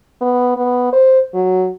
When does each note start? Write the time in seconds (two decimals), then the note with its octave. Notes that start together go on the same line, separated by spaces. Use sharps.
0.22 B3
0.57 B3
0.93 C5
1.34 F#3